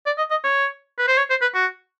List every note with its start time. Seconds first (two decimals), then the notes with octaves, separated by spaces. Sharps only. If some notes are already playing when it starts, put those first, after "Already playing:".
0.06 D5
0.18 D#5
0.31 D#5
0.44 C#5
0.98 B4
1.07 C5
1.17 C#5
1.30 C5
1.41 B4
1.55 F#4